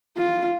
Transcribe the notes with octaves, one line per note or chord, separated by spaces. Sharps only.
F4